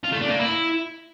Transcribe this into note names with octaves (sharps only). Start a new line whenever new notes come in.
F4
A3
D4
A#3
E4